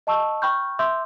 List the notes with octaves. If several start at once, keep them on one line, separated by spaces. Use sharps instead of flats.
D#5 A5 C#6 E6
G5 B5 C#6 F6 G6
E5 C6 D6 E6 G6